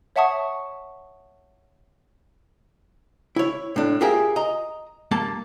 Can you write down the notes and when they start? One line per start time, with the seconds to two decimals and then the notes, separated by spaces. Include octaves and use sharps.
0.16 C#5 E5 F#5 A5 C#6 D#6
3.36 E4 C#5
3.76 A2 D4
4.01 F4 G4 G#4 A#4 E5
4.36 D#5 A#5
5.11 G2 A#3 A5